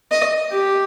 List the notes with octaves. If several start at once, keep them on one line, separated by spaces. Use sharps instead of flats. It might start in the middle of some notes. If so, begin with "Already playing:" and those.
D#5
G4